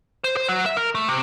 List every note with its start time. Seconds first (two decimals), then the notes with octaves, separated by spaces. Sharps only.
0.24 C5
0.37 C5
0.49 F#3
0.66 E5
0.77 A#4
0.95 A3
1.09 C3